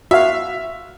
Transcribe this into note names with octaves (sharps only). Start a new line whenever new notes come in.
F#4 E5 F5